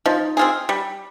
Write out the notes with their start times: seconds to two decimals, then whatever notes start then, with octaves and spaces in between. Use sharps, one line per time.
0.06 F3 D#4
0.37 C4 F4 G#4
0.69 G3